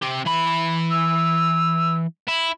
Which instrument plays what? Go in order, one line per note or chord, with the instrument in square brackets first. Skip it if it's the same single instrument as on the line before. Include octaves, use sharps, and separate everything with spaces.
[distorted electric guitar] C4 G4
E3 B5
[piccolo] E6
[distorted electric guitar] E4